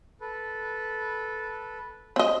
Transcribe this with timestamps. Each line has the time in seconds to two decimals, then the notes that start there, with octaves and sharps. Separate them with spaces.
0.21 A4 B4
2.16 C4 D#5